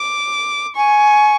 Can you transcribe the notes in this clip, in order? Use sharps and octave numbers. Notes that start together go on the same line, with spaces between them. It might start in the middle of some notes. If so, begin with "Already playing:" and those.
Already playing: D6
G#5 C#6